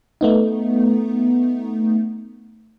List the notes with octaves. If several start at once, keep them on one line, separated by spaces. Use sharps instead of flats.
A3 B3 D#4